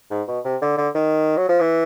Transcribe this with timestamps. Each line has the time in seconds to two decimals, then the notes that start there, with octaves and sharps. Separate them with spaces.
0.11 G#2
0.28 B2
0.45 C3
0.62 D3
0.77 D3
0.95 D#3
1.37 F#3
1.49 F3
1.60 E3